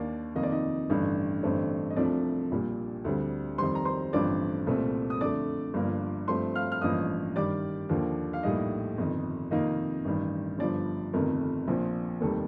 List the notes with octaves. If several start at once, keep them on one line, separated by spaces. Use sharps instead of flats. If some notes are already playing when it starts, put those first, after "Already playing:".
Already playing: D#2 D#3 A#3 D4 D5
F2 C3 D#3 A#3 D#5
D5
D#4 D#5
A1 G2 D3
A1 G2 D3 A3 C4
D#5
C2 C3 F3 A3 D4 D5
A#1 A#2 G3
D2 D3 G3 C4
F2 D#3 G3 C5 C6
A#5
C5 C6
A1 G2 D3 F3 C4 D5 D6
C2 A#2 A3 C4
D#6
F2 D3 A3 D5 D6
G1 G2 F3 A#3
G2 F3 A3 C4 C5 C6
F5 F6
F6
A1 G2 F3 A#3 D#5 D#6
G2 D#3 G3 D5 D6
D#2 D3 F3 A#3
F5
A#1 A2 G3 A#3 D#4 D#5
G1 F2 D#3
F2 C3 D#3 A#3 D#4 D#5
A1 G2 D#3
G1 G2 F3 D4 D5
G1 F2 C3 D#3 A3 A#4
A#1 A#2 F3 C4
F1 D#2 D#3 G3 A4